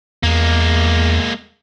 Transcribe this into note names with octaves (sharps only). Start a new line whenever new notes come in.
E2 G#3 A#3